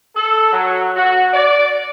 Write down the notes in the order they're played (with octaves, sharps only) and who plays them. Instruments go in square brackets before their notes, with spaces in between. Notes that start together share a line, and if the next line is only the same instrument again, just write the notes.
[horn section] A4
F#3
F#4
D5